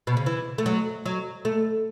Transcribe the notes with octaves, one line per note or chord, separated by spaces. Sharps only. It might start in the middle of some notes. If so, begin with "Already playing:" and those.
B2
C#3
E3
A3
F#3
F#3
A3